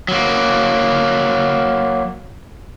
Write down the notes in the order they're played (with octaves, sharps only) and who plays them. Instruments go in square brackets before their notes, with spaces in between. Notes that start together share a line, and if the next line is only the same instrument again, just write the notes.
[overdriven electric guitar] F#3 A#3